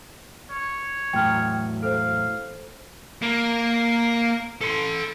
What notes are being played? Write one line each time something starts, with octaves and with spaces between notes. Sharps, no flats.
C#5
E2 A2 F#3 G5 F6
A4 C5 F5
A#3
A4 C6